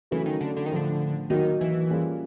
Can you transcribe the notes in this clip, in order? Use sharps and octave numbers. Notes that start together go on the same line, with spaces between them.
C#3 E3 F#3 A3 C#4
D#3
D3
D3
D#3
A2 D3 F3 A3
D#3 F#3 A#3 D#4 F#4
E3
G3 A#3 C#4 F4 G#4